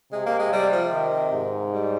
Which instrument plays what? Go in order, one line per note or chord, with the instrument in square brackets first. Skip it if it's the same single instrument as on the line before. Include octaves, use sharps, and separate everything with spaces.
[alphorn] C3 [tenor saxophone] G#3
[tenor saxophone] A#3
G#3
G3
F3
D#3
[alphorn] G#2
[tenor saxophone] G3